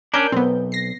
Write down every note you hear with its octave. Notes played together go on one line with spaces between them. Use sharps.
C#4 D4 A#4 D5 G6
B1 B3 C4
A#6 C7